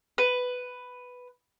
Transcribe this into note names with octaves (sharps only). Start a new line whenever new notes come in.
B4